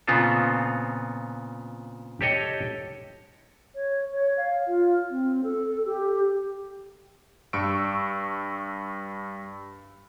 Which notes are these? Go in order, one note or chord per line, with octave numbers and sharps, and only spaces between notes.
A#2 C#3 B3 C4 F4 A4
G4 A4 C#5 D#5 G5
C#5
C#5
F5
F4
C4
A4
G4
G2 C#6 E6 D7